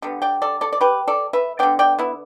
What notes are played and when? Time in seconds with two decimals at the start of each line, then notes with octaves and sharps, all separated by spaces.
0.02 D3 G3 B3
0.22 D5 G5
0.42 A4 D5
0.61 A4 D5
0.73 D5
0.81 G4 B4
1.08 A4 D5
1.33 B4 E5
1.59 D3 B3 D5 G5
1.79 D5 G5
1.99 B3 E4